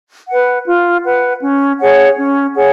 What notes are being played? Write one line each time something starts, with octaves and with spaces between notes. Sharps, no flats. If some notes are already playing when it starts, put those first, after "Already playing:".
B4 F#5
F4
B4 F#5
C#4
G#4 C#5 F#5
C#4
G#4 C#5 F#5